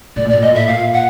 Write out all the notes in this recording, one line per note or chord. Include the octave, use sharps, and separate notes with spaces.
A2 D5
A#2
D5
A2
A#2 D#5
A2 E5
A#2 F5
F#5